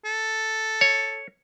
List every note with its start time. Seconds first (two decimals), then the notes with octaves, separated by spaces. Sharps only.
0.05 A4
0.81 C#5